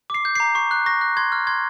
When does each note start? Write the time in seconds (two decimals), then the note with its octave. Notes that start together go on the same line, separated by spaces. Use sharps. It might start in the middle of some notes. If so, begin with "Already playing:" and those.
0.10 D6 C7
0.25 G6
0.35 C7
0.40 A#5
0.55 C#6 C7
0.71 F#6
0.86 C#6 A#6
1.01 F#6
1.17 C6 G#6
1.32 F6
1.47 C6 G#6